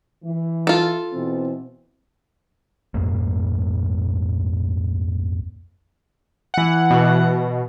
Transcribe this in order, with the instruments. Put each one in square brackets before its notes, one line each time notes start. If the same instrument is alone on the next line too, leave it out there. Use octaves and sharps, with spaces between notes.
[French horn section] E3
[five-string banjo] F4 A4
[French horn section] B2 E3 C4
[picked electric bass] A#1 F2 G#2 A#3
[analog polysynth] E3 F#5
[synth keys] B2